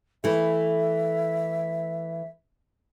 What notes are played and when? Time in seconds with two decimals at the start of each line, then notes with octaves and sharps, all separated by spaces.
0.24 E3 A3 E5